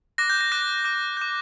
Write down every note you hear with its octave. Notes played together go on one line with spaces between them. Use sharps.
D6 F#6 A#6
G6
A#6
D6 F#6 A#6
D6 F#6
D6 G6